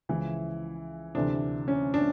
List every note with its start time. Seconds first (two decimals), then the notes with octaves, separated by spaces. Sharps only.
0.09 C#2 C#3 E3 F3 E4
1.15 D2 C3 E3 D4
1.68 C#4
1.94 D4